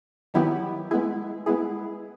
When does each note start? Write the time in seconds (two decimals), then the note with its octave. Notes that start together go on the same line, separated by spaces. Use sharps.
0.34 D#3 F#3 B3 E4 G4
0.91 G#3 B3 E4 G#4
1.46 G#3 B3 E4 G#4